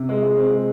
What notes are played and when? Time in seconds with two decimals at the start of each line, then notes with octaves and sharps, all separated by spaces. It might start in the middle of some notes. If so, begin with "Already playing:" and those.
Already playing: C3
0.09 G#3
0.23 G#3
0.37 C4
0.51 G#3